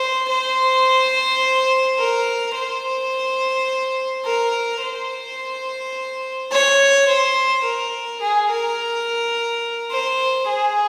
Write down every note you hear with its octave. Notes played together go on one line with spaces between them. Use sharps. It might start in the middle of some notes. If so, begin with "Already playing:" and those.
Already playing: C5
C5
A#4
C5
A#4
C5
C#5
C5
A#4
G#4
A#4
C5
G#4